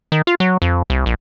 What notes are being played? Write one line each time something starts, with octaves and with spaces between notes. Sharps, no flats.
D#3
F4
F#3
F2
C2
A#1